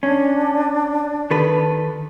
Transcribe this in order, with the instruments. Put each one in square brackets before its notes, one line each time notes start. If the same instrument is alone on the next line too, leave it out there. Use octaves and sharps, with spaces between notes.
[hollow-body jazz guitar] C#4 [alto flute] D4
[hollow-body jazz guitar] D#3 A4 B4